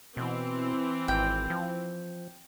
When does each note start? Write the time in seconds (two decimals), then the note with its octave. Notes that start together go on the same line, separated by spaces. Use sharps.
0.17 B2 E3 C4
1.08 G#1 G5
1.50 F3